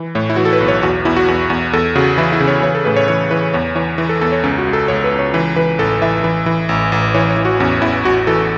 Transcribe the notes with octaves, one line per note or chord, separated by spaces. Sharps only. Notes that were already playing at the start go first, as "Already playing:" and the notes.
Already playing: E3
A2 C#5
E4
E3 F#4
A4
B4
B1
C#5
E2 F#4
E2 E4
F#4
E2
E2
E2 A4
C#3 F#4
E3 E4
E4
C#3
C#5
E3 C#5
A4
A2 B4
C#5
E3 C#5
E3 B4
E2 C#5
E3 C#5
E3
A4
E2 A4
C#5
C#2 C#4
F#4
C#2
A4
C#2 C#5
B4
C#2
C#5
E3 B4
E3 B4
A1 A4
E3 E5
E3
E3
A1
A1
E3 C#5
C#5
E3
F#4
E2 C#4
E2 E4
A1 F#4
E3 A4